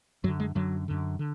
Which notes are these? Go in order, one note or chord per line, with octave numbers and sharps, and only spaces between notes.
F#2 D3 F#3
G#3
F#2 D3 F#3
F#2 D3
D3